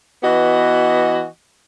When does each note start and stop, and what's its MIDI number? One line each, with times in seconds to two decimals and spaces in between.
0.23 1.26 52
0.23 1.26 59
0.23 1.26 66
0.23 1.26 75